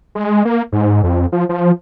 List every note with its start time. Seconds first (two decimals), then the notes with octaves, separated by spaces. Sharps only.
0.15 G#3
0.45 A#3
0.72 G#2
1.04 F2
1.32 F3
1.49 F3